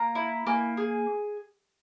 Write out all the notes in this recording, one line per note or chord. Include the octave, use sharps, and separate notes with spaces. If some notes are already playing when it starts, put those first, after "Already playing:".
Already playing: A#3 A#5
E4
A#3 G#5
G#4